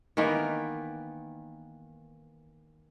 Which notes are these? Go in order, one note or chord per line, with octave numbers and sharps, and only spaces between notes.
D#3 E3 A#3 B3